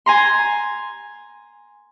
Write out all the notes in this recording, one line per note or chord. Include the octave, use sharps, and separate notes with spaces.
G#5 A#5 C6